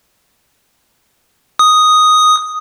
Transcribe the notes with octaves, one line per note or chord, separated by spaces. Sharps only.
D#6